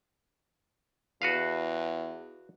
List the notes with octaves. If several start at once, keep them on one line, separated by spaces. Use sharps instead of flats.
E2 F#4 B4 F5